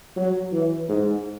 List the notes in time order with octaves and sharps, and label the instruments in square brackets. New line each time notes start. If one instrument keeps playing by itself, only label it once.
[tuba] F#3
E3
G#2